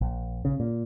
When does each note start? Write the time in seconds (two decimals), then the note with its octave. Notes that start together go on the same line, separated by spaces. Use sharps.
0.01 A#1
0.45 C#3
0.60 A#2